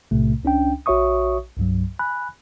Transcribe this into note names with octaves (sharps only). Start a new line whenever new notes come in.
B1 A2 C3 A3
C#2 C#4 D4 G5
A#1 F#4 C#5 E5 C#6 D#6
C2 G2 F#3
G#5 B5 F#6